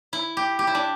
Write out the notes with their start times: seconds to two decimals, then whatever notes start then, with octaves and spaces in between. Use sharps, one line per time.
0.13 E4
0.37 G4
0.59 G4
0.67 E4
0.75 D4